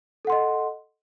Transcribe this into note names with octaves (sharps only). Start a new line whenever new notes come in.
A4 D#5 F#5 C6